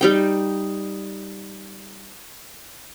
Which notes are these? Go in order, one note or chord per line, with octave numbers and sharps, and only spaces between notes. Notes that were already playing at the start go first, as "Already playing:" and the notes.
G3 D#4 G5